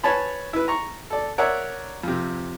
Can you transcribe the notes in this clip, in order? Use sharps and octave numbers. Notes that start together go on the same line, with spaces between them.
B4 C#5 G#5 A5 B5
E4 B4
A#5 C#6
A4 D5
A#4 C#5 D5 E5 F#5
F2 C3